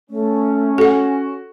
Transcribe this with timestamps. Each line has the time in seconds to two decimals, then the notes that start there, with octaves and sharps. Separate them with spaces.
0.10 A3 C#4
0.78 F#4 A4 F#5